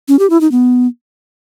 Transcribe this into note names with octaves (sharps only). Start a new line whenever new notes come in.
C#4
G4
E4
D#4
B3